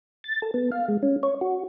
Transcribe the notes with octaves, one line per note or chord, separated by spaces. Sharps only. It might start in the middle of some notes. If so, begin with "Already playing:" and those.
A6
A4
B3
F5
G#3
C#4
C#5
F#4